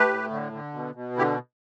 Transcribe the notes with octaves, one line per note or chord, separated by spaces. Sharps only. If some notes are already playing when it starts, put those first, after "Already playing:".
Already playing: A3 G4 B4
A2
D3
D3
B2
B2
D3 E4 G4